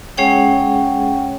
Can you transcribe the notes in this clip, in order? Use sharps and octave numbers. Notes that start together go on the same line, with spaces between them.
G#3 C#4 G#4 C#5 F#5 G5